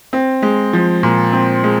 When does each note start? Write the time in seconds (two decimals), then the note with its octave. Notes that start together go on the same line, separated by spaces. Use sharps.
0.13 C4
0.42 G#3
0.73 F3
1.03 A#2
1.33 C4
1.64 G#3